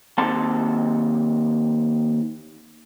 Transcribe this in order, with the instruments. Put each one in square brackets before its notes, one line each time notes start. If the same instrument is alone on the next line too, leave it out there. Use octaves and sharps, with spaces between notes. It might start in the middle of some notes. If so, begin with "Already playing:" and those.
[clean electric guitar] D#2 C4 F#5 A5 C6